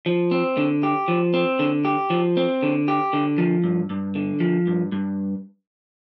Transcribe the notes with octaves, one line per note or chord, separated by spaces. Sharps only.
F3
C4
D3
G4
F3
C4
D3
G4
F3
C4
D3
G4
D3
F3
G2
G2
D3
F3
G2
G2